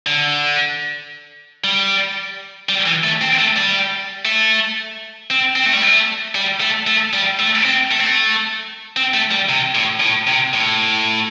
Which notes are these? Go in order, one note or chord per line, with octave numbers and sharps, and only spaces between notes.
D3
G3
G3
E3
A3
C4
A3
G3
A3
C4
C4
A3
G3
A3
G3
A3
A3
G3
A3
C4
A3
C4
A3
C4
A3
G3
C3
A2
A2
C3
A2